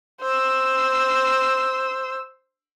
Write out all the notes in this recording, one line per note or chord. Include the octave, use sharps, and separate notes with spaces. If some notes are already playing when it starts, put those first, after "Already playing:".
C5 E6